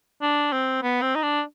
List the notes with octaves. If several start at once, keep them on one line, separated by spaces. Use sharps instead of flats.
D4
C4
B3
C4
D#4
D4